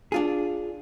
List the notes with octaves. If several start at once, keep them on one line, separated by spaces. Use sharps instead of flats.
D4 F4 G#4